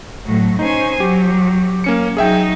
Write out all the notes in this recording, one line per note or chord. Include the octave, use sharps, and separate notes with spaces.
A2 F#3
C#4 D#4 C5 G#5
F#3 G4
A#3 C#4 C#7
F#3 D#4 G#4 E5 G5